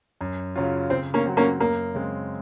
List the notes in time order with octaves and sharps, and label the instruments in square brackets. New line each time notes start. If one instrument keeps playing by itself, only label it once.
[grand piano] F#2
C#3 F#3 C#4 F4
[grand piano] C#3 [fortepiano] C4
[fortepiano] A#3 C#4
[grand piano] F#3 C4 F#4
[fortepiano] A#3 C#4
[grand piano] F#2 [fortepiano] A#3
[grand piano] C#3 G#3 C4